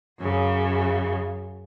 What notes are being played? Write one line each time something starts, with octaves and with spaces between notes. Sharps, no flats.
F#2 C#3